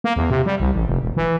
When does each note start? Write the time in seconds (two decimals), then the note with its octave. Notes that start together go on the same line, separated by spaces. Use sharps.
0.04 A#3
0.16 E2
0.30 C3
0.46 G3
0.60 C2
0.74 A1
0.87 F1
1.02 E1
1.17 E3